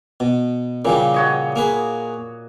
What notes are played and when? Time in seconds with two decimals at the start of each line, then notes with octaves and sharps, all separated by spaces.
0.20 B2
0.85 A#2 C#3 E3 G3
1.14 F#4 C#5 D#5
1.56 A#3 G#4 B4